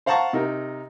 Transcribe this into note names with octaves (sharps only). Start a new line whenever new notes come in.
C5 F5 F#5 A5 A#5 C#6
C3 D#4 A#4